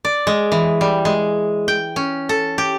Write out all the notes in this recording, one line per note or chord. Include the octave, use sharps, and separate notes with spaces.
D5
G#3
E3
G3
G#3
G5
C#4
A4
G4